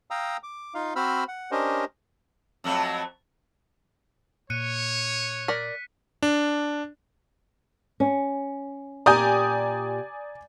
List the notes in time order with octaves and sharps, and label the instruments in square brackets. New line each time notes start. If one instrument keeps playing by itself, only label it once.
[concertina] F5 G5 A#5 D#6 E6
D6
D#4 F4 F5
C4 F#4 C5 B5 E6 F6
F#5
C#4 D4 G4 A#4 C5 D#5
[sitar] F2 F#3 A3
[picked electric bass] A#2 [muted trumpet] C#5 [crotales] F#6 C#7 D#7
[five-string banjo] A#4 D5 [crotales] B6
[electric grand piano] D4
[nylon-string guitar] C#4
[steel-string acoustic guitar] A#2 G4 [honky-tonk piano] D5 G#5 [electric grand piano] A#5 D#6 G6